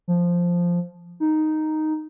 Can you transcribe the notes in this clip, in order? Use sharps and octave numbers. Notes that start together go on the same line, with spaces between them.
F3
D#4